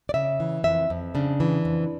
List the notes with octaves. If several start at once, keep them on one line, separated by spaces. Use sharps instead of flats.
D5
C#3 E5
E3
F2 E5
F2
C#3 D4
E3
F2